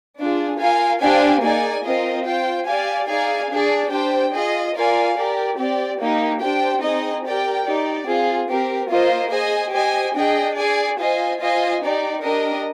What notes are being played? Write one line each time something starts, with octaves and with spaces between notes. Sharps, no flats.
D4 F4 G#4
F4 A#4 F5 G#5
D4 G4 C5 F5 G#5
A#3 D#4 G#4 D5 G#5
C4 F4 A#4 D#5
F4 C5 G5
G4 D5 F5 G#5
D#4 G#4 D5 F5 G#5
D4 G#4 D5
D4 G4 C5 G5
F4 G#4 D#5
F4 A#4 D5 F5 G#5
G4 A#4 D5
C4 G4 D5
A#3 D#4 G4
D4 G4 C5 G5
C4 D#4 G#4 D#5
G4 A#4 D5 G5
D#4 G4 D5
C4 F4 G#4
C4 G4 A#4
A#3 F4 C5 D#5
G#4 C5 D#5 G#5
G4 C5 D#5 G#5
D4 G#4 D#5 G5
G#4 D5 G#5
F4 C5 D#5 G#5
F4 C5 D#5 G#5
D#4 G4 D5
D4 G4 A#4 D#5